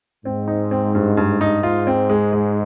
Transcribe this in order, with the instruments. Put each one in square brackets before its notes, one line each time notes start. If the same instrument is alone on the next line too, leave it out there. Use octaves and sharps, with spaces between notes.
[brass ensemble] G#2 [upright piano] C4
[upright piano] D#4
C4
G2
G2
D#4
[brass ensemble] G#2 [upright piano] F4
[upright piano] C4
G#3
G#3